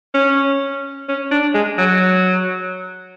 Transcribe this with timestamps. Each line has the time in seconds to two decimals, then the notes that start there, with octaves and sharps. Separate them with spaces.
0.14 C#4
1.09 C#4
1.31 D4
1.54 G#3
1.78 F#3